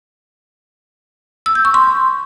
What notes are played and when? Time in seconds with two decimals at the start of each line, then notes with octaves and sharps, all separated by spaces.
1.46 E6
1.55 G6
1.65 C#6
1.74 C6